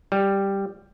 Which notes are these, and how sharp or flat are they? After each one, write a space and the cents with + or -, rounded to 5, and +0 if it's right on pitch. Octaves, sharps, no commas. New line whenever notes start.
G3 +5